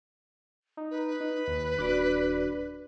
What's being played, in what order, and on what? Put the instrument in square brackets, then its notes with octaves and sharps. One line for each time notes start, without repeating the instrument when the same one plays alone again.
[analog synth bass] D#4
[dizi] B4
[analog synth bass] D#4
D#2
[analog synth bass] D#1 [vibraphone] D4 F#4 D5